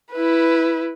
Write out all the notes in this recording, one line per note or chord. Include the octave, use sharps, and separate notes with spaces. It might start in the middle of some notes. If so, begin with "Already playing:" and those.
E4 B4